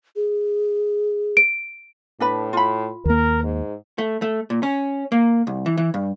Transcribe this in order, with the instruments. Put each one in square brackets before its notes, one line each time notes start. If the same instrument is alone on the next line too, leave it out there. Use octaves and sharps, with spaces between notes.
[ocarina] G#4
[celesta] D7
[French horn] A2 [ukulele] D4 B4 B5
[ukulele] F4 B5
[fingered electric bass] D#2 A#3 [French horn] A#4
[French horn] G#2
[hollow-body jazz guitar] A3
A3
A#2
C#4
A#3
C2
E3
E3
G2